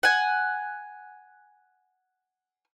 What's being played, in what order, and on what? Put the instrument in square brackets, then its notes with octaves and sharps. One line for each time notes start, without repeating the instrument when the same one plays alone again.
[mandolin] F#5 G#5